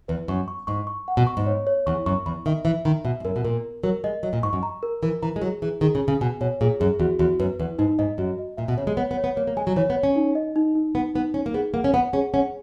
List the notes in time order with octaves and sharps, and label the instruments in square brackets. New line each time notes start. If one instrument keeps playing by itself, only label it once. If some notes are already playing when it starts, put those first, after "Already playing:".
[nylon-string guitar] E2 [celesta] B4
[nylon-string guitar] F#2 [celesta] C#6
[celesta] C#6
[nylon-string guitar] G#2 [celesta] C#6
[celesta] C#6
F#5
[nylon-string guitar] B2
[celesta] C#6
[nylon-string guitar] G#2
[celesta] C#5
C#5
[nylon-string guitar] E2 [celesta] C#6
[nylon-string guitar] F#2 [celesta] C#6
[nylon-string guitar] E2 [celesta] B5
[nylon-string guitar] D#3 [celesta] E5
[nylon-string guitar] E3 [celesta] E5
[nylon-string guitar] D#3 [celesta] B5
[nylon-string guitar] B2 [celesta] E5
[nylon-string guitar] G#2
[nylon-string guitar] F#2 [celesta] A#4
[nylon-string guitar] B2
[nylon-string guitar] A#2 [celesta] A#4
[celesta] A#4
[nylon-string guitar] F#3 [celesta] A#4
[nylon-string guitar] G#3 [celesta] D#5
[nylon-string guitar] F#3 [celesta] D#5
[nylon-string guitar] A#2
[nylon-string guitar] G#2 [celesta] C#6
[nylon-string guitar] F#2
[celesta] A#5
A#4
[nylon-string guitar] E3 [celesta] A#4
[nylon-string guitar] E3 [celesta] A#5
[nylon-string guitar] G#3
[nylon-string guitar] F#3 [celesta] G#4
[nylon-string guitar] E3 [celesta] G#4
[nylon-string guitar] D#3 [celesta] G#4
[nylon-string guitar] C#3
[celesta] G#4
[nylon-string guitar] C#3
[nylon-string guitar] B2 [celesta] G#5
[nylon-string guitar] B2 [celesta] C#5
[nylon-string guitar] A#2 [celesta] G#4
[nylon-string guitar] F#2 [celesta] G#4
[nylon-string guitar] E2 [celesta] F#4
[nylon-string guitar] E2 [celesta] F#4
[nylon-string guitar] F#2 [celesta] B4
[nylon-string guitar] E2 [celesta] B4
[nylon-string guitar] G#2 [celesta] D#4
[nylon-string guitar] G#2 [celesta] D#5
[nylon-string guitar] F#2 [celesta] F#4
[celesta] D#5
[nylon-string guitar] A#2 [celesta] E5
[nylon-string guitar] B2
[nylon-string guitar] C#3 [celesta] C#5
[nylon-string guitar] G#3
[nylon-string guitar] B3 [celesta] C#5
[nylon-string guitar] B3
[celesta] C#5
[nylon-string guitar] B3
[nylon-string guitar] A#3 [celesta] C#5
[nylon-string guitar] A#3
[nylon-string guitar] G#3 [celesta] G#5
[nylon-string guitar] F#3
[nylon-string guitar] E3 [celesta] C#5
[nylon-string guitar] B3
[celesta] C#5
[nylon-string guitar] C#4
[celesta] D#4
D#5
D#4
D#4
[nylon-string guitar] B3 [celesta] D#4
[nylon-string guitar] B3 [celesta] D#4
[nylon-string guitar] C#4 [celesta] D#4
[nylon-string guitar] A#3
[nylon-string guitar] B3 [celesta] G#4
[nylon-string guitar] A#3 [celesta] F#5
[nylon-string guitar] C#4
[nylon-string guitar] B3 [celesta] F#5
[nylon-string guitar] C#4 [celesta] G#4
[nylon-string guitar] C#4 [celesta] F#5